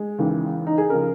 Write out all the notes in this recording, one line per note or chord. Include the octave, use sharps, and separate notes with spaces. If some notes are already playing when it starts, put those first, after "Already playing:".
Already playing: G#3
D#2 C#3 E3
D#4
G#4
C#3 F3 A#4